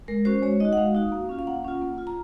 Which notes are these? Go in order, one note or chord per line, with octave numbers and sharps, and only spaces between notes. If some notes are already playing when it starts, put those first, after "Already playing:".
G#3 A#4
C#4 F#4 C5
G#3 C#5
D#4 F#4 D#5
F#5
G#3 F5
D#4 F#4
A#3
C#4 F4
F5
A#3 F#5
C#4 F4
A#3
F4
A#5